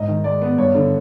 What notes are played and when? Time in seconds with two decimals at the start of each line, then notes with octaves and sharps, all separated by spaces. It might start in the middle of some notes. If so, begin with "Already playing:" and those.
Already playing: G#2 D#5
0.08 D#3
0.24 G#3 D5
0.42 B3
0.58 G2 C#5
0.75 D3